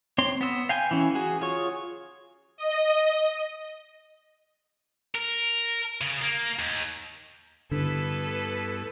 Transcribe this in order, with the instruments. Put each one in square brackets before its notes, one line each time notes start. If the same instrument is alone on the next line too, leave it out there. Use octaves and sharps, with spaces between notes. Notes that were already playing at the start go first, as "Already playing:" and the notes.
[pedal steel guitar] C4 C#5 C6
B3 E6
F5 G5 G#5
E3 C#4
F#4 G#4
F4 G#4 C#5 C#6
[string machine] D#5
[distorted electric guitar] A#4
C#3
A#3
D#2
[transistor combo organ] G2 B3 E4 [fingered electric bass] D3 [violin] A4 B4